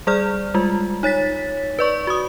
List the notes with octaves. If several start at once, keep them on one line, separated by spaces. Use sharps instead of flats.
G3 G#4 D5 F6
G3 G#3 F4
D#4 C#5 A6 B6
B4 D5 C#6
F#4 D#6